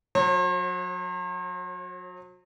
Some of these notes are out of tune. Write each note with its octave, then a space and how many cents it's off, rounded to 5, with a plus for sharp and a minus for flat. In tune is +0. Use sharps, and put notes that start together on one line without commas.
F#3 -30 C5 +45